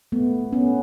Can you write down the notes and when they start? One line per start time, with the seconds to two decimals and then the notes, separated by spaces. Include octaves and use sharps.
0.12 A3 B3
0.52 B3 C#4